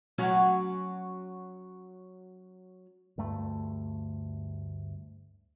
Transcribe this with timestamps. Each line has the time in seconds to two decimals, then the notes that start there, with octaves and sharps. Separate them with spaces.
0.18 F#3 C#4 F#4
3.18 D2 G2 A3